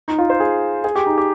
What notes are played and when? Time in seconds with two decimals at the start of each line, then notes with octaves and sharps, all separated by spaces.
0.08 D#4
0.18 F4
0.30 C5
0.40 G#4
0.84 G#4
0.95 G4
1.06 D#4
1.18 G4